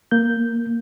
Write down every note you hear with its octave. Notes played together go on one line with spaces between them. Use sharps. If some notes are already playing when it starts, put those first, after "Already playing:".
A#3 G6